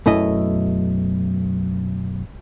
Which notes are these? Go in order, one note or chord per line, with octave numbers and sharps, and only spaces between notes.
B1 F#2 A3 E4 D#5